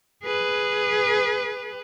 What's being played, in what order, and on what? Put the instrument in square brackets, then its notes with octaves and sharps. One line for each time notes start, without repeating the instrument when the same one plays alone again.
[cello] G#4 B4